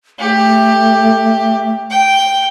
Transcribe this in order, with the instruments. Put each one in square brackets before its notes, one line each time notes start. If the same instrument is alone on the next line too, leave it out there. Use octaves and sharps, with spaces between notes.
[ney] A3 [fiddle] G4
[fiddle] G5